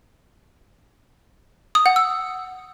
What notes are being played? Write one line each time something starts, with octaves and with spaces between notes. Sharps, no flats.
D#6
F#5
E6